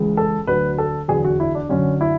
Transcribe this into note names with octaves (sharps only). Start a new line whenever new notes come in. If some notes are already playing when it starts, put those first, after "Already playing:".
Already playing: C#2 C#3 E3
A4
D2 D3 F#3 B4
A4
E2 D3 F#3 G#4
F#4
E4
D4
F#2 D3 F#3 C#4
E4